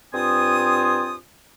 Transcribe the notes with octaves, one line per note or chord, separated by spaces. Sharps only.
G2 C4 F4 C5 G#5 D#6